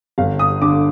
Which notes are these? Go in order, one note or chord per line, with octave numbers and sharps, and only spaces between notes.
G1 F5
D#6
D3 D6